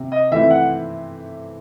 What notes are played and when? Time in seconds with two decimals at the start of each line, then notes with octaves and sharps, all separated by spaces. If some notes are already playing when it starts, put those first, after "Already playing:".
Already playing: C3
0.12 D#5
0.31 E3 A3 C4 E4 E5
0.51 F#5